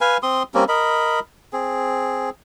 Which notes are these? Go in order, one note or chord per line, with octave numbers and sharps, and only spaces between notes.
B4 F5 G#5
C4 C6 D#6
G3 A#3 C4 C#4
A#4 D#5 B5
C4 G#4